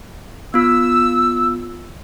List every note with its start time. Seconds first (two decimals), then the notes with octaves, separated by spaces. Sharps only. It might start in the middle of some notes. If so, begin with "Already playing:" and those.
0.54 B3 F4 E6